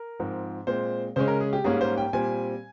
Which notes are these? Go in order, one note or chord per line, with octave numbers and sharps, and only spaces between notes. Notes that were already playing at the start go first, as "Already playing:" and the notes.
Already playing: A#4
G#2 F3 C4
A#2 G#3 C4 C5
C#3 G#3 C#4 C5
A#4
G#4
G4
G#2 G3 A#3 C#4 G#4
C5
G5
A#2 G3 C4 G#5